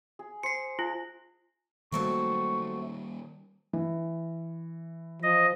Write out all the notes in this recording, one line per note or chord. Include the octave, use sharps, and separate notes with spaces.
G#4
C5 C7 C#7
F4 G#4
D#3 F#3 G3 A3 A#3 C4 C#6
E3
F3 D#5